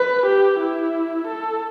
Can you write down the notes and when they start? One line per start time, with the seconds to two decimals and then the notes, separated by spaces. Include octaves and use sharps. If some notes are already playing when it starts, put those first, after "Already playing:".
Already playing: B4
0.26 G4
0.60 E4
1.27 A4